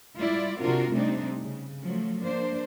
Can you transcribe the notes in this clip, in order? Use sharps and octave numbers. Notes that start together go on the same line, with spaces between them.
G3 G#3 E4 F4 D5
C3 C4 D4 F4 F#4 A#4
C3 G3 A3 C4 D4 D#4
C#3
F3 F#3 A3
A#3 D4 C5